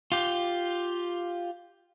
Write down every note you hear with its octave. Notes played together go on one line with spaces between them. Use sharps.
F4 G4